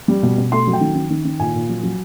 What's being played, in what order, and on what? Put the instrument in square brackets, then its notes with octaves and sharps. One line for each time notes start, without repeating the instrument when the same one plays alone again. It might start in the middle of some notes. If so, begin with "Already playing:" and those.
[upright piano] G3
B2
B2
A3 C6
F#3
G5
D#3
D#3
D#3
D#3
A#2 G#5
A#2
F#3
F#3